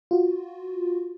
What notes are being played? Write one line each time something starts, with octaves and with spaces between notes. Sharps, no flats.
F4 F#4